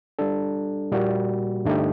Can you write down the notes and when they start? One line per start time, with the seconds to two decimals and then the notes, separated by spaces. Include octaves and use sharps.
0.19 G3 D4 A4
0.92 A#2 G3 A#3 F#4
1.65 G2 D3 A3 D#4 G4